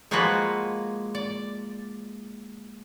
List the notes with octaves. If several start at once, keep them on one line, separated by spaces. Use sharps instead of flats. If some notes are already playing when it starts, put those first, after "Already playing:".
F3 G#3 A#3 F4 F#4 B4
D5